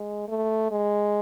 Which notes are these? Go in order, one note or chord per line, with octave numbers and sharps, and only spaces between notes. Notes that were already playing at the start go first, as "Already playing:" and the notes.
Already playing: G#3
A3
G#3